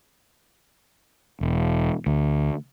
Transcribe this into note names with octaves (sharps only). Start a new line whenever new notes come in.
E1
D2